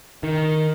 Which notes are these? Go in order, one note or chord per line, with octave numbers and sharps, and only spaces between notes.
D#3